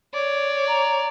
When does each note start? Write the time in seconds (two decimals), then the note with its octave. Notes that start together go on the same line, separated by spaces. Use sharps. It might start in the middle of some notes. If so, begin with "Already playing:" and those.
0.14 C#5 D5
0.67 A#5